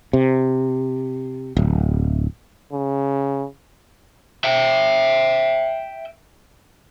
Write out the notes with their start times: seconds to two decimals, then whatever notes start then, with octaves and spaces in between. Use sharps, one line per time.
0.13 C3
1.57 D1
2.73 C#3
4.44 E5 G5